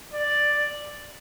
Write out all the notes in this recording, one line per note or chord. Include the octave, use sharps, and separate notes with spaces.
D5